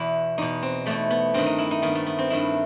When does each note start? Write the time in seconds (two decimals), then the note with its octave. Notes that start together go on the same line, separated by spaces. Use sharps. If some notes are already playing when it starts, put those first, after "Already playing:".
Already playing: E2 B2 E4
0.38 E2 B2 D#4
0.63 C4
0.86 E2 B2 A3
1.10 B3
1.34 G2 D#3 C4
1.46 D#4
1.58 E4
1.71 D#4
1.82 G2 D#3 B3
1.95 A3
2.06 B3
2.18 C4
2.30 G2 D#3 E4